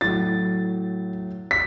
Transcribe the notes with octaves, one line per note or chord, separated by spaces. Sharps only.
A2 F#3 A6
B6